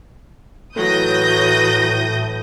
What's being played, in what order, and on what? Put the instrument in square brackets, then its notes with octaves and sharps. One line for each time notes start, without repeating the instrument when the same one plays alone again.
[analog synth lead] A2 [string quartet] E3 F#3 [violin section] D#6 G6 A#6